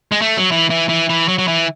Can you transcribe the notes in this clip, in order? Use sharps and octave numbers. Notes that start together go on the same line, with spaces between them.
G#3
A3
F#3
E3
E3
E3
E3
F#3
F#3
E3